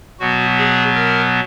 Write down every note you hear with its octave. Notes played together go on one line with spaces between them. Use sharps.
B2 F#3 B3 F#4
G#4
A#4